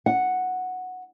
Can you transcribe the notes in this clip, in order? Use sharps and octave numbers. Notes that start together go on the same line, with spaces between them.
F#5